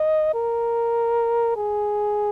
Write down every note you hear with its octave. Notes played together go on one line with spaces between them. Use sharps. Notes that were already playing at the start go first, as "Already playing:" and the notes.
Already playing: D#5
A#4
G#4